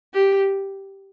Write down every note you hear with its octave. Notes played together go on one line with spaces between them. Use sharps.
G4